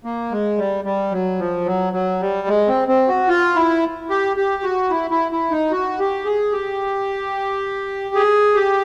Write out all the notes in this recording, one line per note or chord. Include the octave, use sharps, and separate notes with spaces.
A#3
G#3
G3
G3
F#3
F3
F#3
F#3
G3
G#3
C4
C4
F#4
F4
E4
G4
G4
F#4
E4
E4
E4
D#4
F#4
G4
G#4
G4
G#4
G4